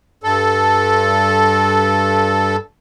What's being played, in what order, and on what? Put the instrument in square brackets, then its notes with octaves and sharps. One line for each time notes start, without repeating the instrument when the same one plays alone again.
[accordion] G2 A4